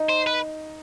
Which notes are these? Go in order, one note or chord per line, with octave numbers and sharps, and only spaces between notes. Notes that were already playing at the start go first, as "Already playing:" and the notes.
Already playing: D#4
C5
B4